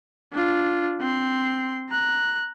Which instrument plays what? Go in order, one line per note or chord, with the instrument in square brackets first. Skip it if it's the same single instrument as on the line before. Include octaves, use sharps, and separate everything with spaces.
[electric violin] D4 F4
C4 C6
A#5 F#6